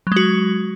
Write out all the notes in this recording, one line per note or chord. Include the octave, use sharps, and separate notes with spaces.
F#3 G#3 F#4